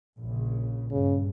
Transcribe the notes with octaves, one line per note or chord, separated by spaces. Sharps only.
A#1 C#3
G2 C#3